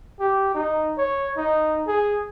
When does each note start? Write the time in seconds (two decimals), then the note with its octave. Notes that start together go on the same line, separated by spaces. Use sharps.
0.20 G4
0.55 D#4
0.98 C#5
1.37 D#4
1.87 G#4